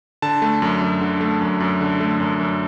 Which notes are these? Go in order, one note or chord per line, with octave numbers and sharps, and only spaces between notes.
D3 A5
A3
F#2
F#2
D3
A3
F#2
F#2
D3
A3
F#2
F#2